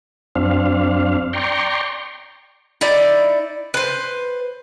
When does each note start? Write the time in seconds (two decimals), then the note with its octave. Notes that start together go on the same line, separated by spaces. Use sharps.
0.35 F#2 C4 D4 F5
1.33 D5 G5 A#5 C6 C#6
2.81 D#4 E4 D5
3.74 B4 C5